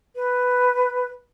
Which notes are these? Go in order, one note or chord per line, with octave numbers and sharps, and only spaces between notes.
B4